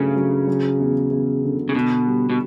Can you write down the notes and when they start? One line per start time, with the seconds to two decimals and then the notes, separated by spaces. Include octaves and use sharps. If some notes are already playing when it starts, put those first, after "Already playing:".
Already playing: G2 C#3 F#3 A3
0.16 F#3
0.48 F#3
0.80 E2
1.11 E2
1.43 D3
1.69 C#3
1.75 B2 D3
2.06 G3
2.30 B2